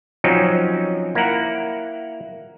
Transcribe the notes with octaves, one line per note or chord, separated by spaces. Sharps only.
F3 F#3 C4 C#4 D#4
A#3 E4 A#4 F#5